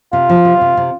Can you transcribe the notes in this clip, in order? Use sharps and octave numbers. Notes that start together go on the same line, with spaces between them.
C3 F4
F3
C3
C3
C3